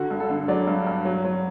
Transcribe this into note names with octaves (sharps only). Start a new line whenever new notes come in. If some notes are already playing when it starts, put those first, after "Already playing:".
Already playing: D3 F#4
G2
A4
D3
F#3 D5
G2
G2
F#3
F#3